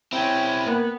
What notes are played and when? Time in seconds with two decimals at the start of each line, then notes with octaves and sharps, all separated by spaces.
0.13 C4 C#4 E4 G5 G#5 B5
0.66 A#3 B3